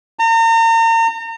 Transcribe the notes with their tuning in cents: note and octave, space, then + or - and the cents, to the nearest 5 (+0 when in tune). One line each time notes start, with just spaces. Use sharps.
A#5 -40